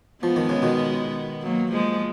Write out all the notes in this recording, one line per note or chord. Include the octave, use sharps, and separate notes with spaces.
F3 G#3 B3
D#3
C#3
B2 D#3
F#3 A#3
F3 G#3